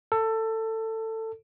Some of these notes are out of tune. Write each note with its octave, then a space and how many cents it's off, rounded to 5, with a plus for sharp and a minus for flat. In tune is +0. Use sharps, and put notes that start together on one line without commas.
A4 +20